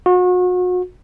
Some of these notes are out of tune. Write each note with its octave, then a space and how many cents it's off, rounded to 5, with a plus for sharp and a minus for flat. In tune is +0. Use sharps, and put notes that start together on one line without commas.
F#4 -35